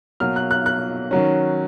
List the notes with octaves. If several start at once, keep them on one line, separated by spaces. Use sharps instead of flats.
B2 F#3 A#3 F6
F#6
F#6
F#6
D#3 F#3 C#4